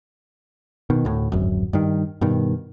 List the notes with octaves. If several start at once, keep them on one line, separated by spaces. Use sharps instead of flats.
B2 D#3
D2 A2
D1 G#1 F#2
G2 D#3
G2 B2 D#3